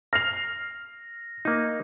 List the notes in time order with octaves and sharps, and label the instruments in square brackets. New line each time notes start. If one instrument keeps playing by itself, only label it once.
[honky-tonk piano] F6 C7 F7 [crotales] A#6
[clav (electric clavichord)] A#3 D#4